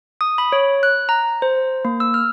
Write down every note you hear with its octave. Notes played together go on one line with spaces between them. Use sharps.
D#6
B5
C#5
F#6
A#5
C5
A#3
E6
F6